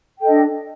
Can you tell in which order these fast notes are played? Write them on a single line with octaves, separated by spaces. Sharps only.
G5 A4 D#5 D4